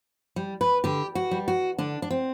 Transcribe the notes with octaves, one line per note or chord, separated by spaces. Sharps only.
G3
B4
D3 G4
F#4
G3
F#4
D3 D4
D4
C4